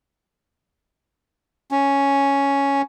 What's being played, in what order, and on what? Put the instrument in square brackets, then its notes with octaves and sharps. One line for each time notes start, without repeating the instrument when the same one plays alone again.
[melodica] C#4